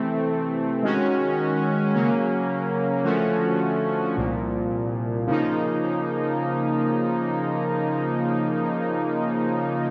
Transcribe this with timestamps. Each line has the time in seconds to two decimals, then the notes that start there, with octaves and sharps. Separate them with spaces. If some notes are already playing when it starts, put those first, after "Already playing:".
Already playing: C3 E3 A3 C4
0.83 D#3 G#3 C#4 F#4
1.93 C#3 F#3 A#3 C#4
3.04 D3 F3 A3 C#4 F#4
4.16 C2 A#2 F3
5.26 C#3 F3 A#3 D#4